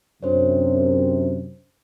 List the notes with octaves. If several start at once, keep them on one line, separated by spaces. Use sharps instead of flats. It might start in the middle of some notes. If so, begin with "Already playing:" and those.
F#2 C3 D4 C5 C#5